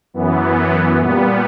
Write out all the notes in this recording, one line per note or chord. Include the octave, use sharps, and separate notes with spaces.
F#2 E3 B3
A#2 G3 B3